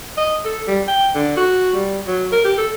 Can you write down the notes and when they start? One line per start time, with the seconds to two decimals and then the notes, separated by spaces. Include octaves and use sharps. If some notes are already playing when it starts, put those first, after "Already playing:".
0.17 D#5
0.45 A4
0.67 G3
0.88 G5
1.15 D3
1.37 F#4
1.74 G3
2.07 F#3
2.32 A#4
2.44 G4
2.58 A4